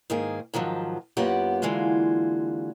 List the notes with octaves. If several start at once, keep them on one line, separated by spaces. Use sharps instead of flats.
G#2 D#3 A#3 G#4
G#2 D#3 F3 F#3
F#2 A#3 B3 F4 G4 F#5
D3 E3 G#3 A#3 F4 F#4